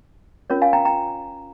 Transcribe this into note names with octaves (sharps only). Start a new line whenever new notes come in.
C#4 F4 A#4 C#5
F5 G#5
G5 A#5
G5 A#5